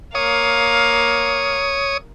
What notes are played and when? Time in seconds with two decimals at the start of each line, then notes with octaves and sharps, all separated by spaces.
0.15 A#3 C#5 F5 D#6